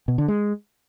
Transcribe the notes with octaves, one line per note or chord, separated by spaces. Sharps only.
B2
D3
G#3